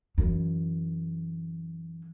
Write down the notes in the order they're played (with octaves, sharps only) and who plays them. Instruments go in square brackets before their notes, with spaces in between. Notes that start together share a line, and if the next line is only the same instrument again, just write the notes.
[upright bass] F#2 E3